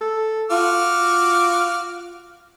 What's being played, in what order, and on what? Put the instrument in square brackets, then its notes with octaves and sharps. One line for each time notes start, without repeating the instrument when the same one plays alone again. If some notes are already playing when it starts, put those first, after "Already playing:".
[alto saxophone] A4
[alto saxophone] F4 [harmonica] F#4 D6 F6